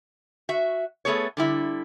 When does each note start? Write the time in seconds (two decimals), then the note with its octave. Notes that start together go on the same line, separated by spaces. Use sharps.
0.49 F#4 E5
1.05 A3 B3 G#4 A4 C#5
1.37 D3 G3 E4